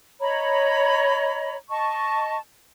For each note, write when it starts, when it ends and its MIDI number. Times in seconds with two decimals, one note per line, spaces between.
0.21 1.56 73
0.21 1.56 75
0.21 1.56 82
0.21 1.56 83
1.70 2.38 75
1.70 2.38 81
1.70 2.38 85